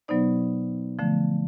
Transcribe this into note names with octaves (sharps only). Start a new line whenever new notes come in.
B2 F#3 B3 D#4 C5 D5
D3 F3 A3